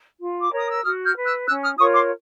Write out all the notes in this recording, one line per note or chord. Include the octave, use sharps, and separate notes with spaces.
F4
D6
A#4 C#5 D#6
E6
F#4 D#6 F6
F6 G6
B4
E6 F#6
C#4 E6 F#6
D#6 F6
F4 A#4 C#5 C#6 D#6
C6 D6